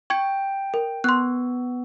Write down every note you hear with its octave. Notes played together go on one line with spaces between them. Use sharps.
G5 C#6 G#6 C#7
A#4
B3 C6 F#6